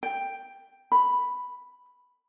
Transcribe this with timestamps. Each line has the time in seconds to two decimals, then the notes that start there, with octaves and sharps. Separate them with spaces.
0.03 G5
0.92 B5